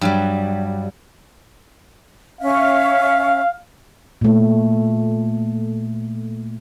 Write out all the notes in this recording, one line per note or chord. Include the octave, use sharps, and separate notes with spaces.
G2 F#3 G3
C#4 E5 F5
A#2 A3